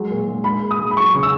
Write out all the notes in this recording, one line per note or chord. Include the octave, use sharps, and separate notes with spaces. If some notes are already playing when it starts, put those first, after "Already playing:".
Already playing: F#3 G#3
A#2
G#3
G#3 B5
A#2
D#6
G#3
B5
F#3 C#6
C#3
E6